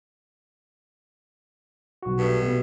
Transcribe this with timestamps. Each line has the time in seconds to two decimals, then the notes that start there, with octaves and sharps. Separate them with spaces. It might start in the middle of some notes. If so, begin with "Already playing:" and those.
2.03 B1 F#4
2.19 G2 A3 B3
2.43 B2